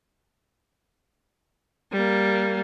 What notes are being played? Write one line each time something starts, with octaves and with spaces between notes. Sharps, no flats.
G3 A#3